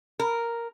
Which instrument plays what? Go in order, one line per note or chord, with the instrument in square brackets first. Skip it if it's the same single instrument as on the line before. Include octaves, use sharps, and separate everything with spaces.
[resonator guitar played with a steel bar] A#4